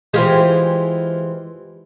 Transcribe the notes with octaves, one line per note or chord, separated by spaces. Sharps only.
E3 G#3 F4 G4 G#4 C5